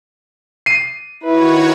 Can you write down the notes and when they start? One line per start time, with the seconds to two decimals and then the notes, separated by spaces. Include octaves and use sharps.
0.66 C7 D#7
1.24 D#3 E4 F#4 B4 C#5